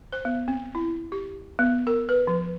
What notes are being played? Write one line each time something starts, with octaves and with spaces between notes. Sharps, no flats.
C5
B3
C4
E4
G4
B3
A#4
B4
F3